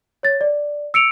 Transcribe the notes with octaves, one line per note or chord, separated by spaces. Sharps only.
C#5 A6
D5
E6 C#7 D7 F7